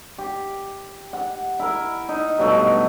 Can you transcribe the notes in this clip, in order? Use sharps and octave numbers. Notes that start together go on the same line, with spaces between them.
G4
F#5
E4 A#4
D#4
G2 B2 F#3 A3